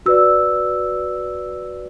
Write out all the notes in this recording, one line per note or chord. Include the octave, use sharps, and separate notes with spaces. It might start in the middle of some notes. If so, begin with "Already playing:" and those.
F#4 B4 D5 E6